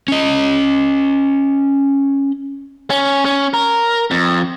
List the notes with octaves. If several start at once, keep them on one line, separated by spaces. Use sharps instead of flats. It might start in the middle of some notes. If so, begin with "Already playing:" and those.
C#4 D#5
C#4
C#4
A#4
F2